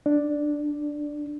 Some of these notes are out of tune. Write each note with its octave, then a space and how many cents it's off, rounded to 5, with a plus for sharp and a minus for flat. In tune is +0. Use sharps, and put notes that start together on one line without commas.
D4 +5 D5 +0